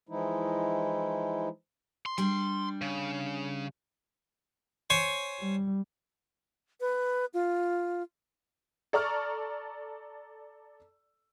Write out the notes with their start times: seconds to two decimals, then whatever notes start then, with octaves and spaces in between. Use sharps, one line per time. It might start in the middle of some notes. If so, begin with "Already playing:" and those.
0.09 E3 F3 G#3 D#4 E4
2.06 C6
2.18 G3 D4 C6
2.81 C#3
4.90 C5 C#5 G#5
5.40 G3
6.81 B4
7.34 F4
8.93 A4 D5 A#5 C#6 F6